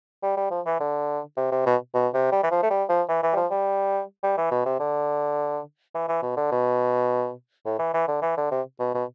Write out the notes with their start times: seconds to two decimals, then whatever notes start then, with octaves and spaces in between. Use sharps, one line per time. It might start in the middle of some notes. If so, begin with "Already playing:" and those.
0.23 G3
0.37 G3
0.51 F3
0.66 E3
0.80 D3
1.37 C3
1.51 C3
1.66 B2
1.94 B2
2.14 C3
2.32 G3
2.43 E3
2.51 F3
2.63 A3
2.70 G3
2.89 F3
3.08 E3
3.23 E3
3.33 G3
3.37 F3
3.51 G3
4.23 G3
4.37 E3
4.51 B2
4.66 C3
4.79 D3
5.94 E3
6.08 E3
6.22 B2
6.37 D3
6.52 B2
7.66 A2
7.79 E3
7.94 E3
8.08 D3
8.22 E3
8.37 D3
8.51 C3
8.80 B2
8.94 B2